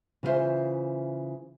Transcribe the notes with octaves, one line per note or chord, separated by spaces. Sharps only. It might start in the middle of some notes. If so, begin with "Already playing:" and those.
C#3 E3 F4 A4 C5 E5